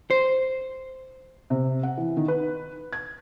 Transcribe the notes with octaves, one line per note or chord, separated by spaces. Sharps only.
C5
C3
F#5
E3
D#3
B4
G#6